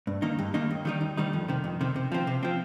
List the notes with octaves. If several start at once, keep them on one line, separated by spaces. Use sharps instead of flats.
G2
D#3 A#3 D#4
G2
D#3 A#3 D#4
D#2
D#3 G3 D#4
D#2
D#3 G3 D#4
F2
C3 D#3
F2
C3 D#3
C3
F3 C4
C3
F3 C4